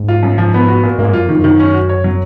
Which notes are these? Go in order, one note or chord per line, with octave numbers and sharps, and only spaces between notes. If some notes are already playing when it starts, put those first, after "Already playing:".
Already playing: G#2
F4
F#2
F3
B3
F#4
A#2
G#2 A#3
F#2 F4
F2 D#3
F#2
D#3
C#4
F#4
C#5
F#3